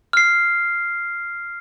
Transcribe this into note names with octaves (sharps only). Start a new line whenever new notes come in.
F6 C7